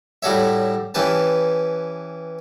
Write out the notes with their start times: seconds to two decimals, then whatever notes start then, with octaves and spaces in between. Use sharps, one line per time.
0.23 A2 G3 F#4 A4 C#5 E5
0.94 E3 C#4 G4 B4 A5